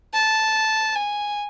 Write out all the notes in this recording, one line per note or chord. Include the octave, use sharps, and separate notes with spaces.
A5
G#5